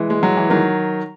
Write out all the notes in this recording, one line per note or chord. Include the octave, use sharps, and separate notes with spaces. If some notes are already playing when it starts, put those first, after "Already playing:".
Already playing: E3 G#3
G#3
F#3
E3
D#3 F#3